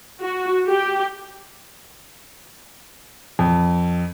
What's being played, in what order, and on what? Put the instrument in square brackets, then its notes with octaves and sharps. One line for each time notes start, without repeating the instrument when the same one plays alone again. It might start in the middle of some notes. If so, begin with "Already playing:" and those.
[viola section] F#4
G4
[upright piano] F2